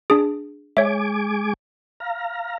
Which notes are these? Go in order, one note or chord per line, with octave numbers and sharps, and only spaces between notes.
D4 G#4
G#3 C#5 E5 G#5 D6
F5 A#5